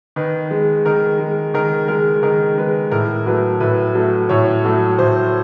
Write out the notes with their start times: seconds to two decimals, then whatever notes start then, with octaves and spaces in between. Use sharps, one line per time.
0.16 D#3 B4
0.51 G#3
0.85 D#3 A#4
1.20 G#3
1.54 D#3 A#4
1.88 G#3 A#4
2.23 D#3 A#4
2.58 G#3 B4
2.91 A2 A#4
3.26 F#3 A3 B4
3.60 A2 B4
3.95 F#3 A3
4.29 A2 C#5
4.65 F#3 A3
4.98 A2 C5